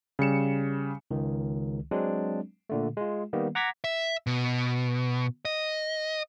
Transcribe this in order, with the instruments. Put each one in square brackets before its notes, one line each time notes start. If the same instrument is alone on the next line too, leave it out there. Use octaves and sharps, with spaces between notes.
[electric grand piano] C#3 G3 C#7 E7
[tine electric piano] C#2 D#3
F#3 G#3 C4 D4
A#2 D3 A3
G#3 F4
D#3 G3 A#3 B3
F#5 A#5 D6 G#6 A#6 B6
[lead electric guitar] E5
B2
D#5